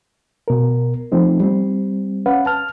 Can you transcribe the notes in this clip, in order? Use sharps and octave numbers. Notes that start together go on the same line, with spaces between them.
B2 A#4
F3 A3 C4 D#4
G3 C4
C#4 B4 F5 F#5
A5 F6